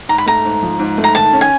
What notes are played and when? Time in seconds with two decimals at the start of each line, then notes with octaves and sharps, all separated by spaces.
0.09 G#2 A#5
0.18 B5
0.26 A3 A#5
0.45 G#2
0.63 F3
0.79 G#2
0.97 A3
1.04 A#5
1.15 D#3 A5
1.33 C#4
1.41 G#5